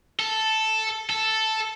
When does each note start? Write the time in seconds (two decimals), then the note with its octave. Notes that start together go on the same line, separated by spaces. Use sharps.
0.20 A4
1.10 A4